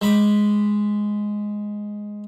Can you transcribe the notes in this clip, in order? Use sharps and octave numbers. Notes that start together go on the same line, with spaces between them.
G#3 B5 D6